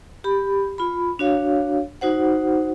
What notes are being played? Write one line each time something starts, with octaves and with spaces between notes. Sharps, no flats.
G4 B5
F4 B5
D4 F#4 C#5 F5
D#4 F#4 C5 F#5